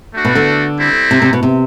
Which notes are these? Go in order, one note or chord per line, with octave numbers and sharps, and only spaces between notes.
A3 D4 F#4
B2
D3
G3 C4 E4
C3
C3
B2
C3